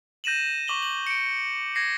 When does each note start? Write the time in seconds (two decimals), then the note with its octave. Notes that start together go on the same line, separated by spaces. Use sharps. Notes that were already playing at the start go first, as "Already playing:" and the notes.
0.24 G6 A#6 D#7 E7 F#7
0.67 C#6 D6 F#7 G7
0.82 F#7
1.07 C#7 D7
1.75 G#6 A#6 C7